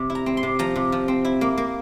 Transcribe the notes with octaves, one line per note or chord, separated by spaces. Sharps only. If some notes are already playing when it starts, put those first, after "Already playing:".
Already playing: C3
E4
A#5
C4
C6
C3
F3 A#5
C3
F3
C4
E4
A#3
A#3